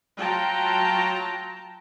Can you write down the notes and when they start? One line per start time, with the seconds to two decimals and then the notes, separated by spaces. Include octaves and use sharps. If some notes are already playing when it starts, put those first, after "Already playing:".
0.17 F#3 F4 G5 A5 A#5